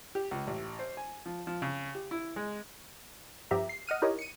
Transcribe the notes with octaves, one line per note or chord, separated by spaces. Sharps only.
G4
C#2
A1
C5
G#5
F3
F3
C#3
G4
E4
G#3
G2 F3 B3 G4 E5 A#5
C7
D#5 F#5 F6 D#7
D#4 E4 G4 A#4 C#5 D#5
C#7 D#7